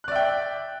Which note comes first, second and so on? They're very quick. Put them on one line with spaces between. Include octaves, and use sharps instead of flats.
F#6 D5 E5 G5